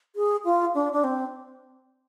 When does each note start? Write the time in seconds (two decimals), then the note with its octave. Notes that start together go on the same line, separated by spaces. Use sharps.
0.16 G#4
0.45 F4
0.75 D4
0.93 D4
1.04 C4